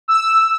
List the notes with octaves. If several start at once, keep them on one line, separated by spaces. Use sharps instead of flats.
E6